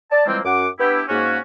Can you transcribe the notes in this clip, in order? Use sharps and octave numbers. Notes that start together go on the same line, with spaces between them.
D5 A5
E3 F3 G3 G#3 A#3 C4
F#2 F#5 D6
B3 D4 E4 G4
G#2 A#3 C#4 F#4